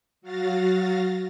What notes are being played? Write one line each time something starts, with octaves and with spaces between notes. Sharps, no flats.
F#3 F#4 F5 A6 A#6